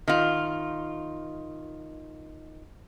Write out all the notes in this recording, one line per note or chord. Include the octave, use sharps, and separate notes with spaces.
D#3 F4